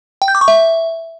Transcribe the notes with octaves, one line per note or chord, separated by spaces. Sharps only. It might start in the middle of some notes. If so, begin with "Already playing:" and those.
G5
G6
D6
C#6
E5